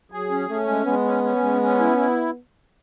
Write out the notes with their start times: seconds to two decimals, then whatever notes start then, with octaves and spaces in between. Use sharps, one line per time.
0.12 F#3 G#4
0.31 C#4
0.49 A3 C#4
0.68 G#3
0.86 G#3 B3
1.05 C#4
1.24 C#4
1.42 G#3
1.62 C#4
1.80 E4
1.97 E4